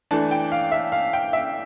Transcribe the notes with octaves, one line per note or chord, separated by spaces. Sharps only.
E3 A3 D4 A5
G5
F5
E5
F5
G5
E5